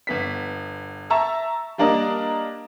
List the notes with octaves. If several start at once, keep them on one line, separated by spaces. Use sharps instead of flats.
G1 B3 B6
E5 A5 A#5 C#6 E6
G3 A#3 D4 A#4 D5 D#5